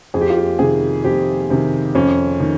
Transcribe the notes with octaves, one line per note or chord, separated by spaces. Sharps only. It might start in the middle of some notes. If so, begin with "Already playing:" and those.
F2 G#4
G4
F4
G4
C3 D#3 G#4
F2 G4
C3 D#3
F2 C#4
D#3